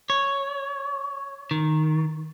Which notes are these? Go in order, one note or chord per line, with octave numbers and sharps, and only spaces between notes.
C#5
D#3